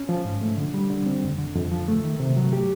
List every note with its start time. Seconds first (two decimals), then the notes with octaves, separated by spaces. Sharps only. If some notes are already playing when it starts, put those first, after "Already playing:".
Already playing: C#4
0.09 F3
0.25 G#2
0.41 A3
0.57 D3
0.74 G3
0.90 D3
1.06 C4
1.23 F2
1.38 D3
1.56 F2
1.72 F3
1.88 A3
2.03 D#3
2.20 C3
2.37 F#3
2.53 G4